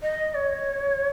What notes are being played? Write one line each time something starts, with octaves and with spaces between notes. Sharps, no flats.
D#5
C#5